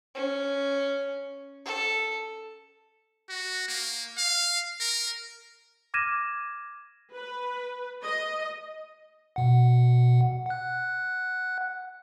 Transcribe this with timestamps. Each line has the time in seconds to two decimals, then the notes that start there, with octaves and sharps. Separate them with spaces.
0.15 C#4
1.66 A4
3.30 F#4
3.68 A#3
4.18 F5
4.80 A#4
5.94 D6 F6 G#6 A#6 D#7 E7
7.14 B4
8.04 D#5
9.36 B2 F#5
10.46 F#5 F#6